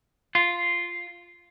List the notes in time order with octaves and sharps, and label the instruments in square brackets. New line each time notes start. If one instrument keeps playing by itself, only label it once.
[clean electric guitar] F4